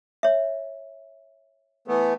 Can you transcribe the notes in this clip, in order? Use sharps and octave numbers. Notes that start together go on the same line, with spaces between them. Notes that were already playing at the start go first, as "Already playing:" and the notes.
C#5 E5
E3 A3 B3